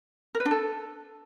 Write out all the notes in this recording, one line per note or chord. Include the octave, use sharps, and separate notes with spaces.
A#4
B4
D4
A4